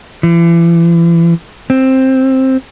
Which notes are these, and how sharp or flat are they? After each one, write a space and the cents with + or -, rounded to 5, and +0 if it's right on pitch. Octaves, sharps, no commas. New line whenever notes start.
E3 +40
C4 +10